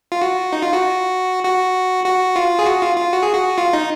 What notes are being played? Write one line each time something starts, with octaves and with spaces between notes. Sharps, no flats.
F4
F#4
D#4
F4
F#4
F#4
F#4
F4
G#4
F#4
F4
F4
F#4
G#4
F#4
F4
D#4